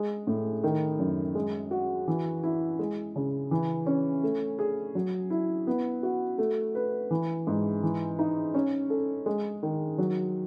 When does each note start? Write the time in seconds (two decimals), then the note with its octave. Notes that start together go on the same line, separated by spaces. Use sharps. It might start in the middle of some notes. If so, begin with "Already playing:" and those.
Already playing: G#3
0.27 A2
0.64 D#3
0.99 F#2
1.35 G#3
1.71 F#4
2.08 E3
2.43 E4
2.79 G#3
3.16 C#3
3.51 E3
3.86 C#4
4.23 A3
4.59 G#4
4.95 F#3
5.30 E4
5.67 B3
6.03 F#4
6.38 A3
6.75 B4
7.11 E3
7.47 G#2
7.83 E3
8.19 D#4
8.54 C#4
8.90 A4
9.26 G#3
9.63 D#3
9.98 F#3